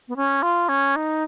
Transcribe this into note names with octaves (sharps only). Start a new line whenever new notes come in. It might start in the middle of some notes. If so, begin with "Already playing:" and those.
B3
C#4
F4
C#4
D#4